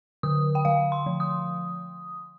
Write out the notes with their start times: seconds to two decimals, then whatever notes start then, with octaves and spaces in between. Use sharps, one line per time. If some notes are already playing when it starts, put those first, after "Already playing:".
0.23 D3 D#6
0.55 G5
0.65 D3 F5
0.92 C6
1.06 F3
1.20 D#6